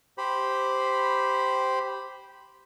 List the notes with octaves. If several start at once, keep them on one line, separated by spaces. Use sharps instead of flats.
G4 C5 B5